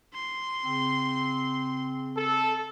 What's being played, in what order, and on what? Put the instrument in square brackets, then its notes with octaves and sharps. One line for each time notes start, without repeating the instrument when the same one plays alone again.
[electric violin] C6
[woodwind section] C#3 C4
[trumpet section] A4